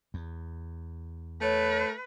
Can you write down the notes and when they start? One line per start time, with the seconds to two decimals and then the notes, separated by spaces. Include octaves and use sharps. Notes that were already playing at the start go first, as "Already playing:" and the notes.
0.14 E2
1.41 A3 B4 C#5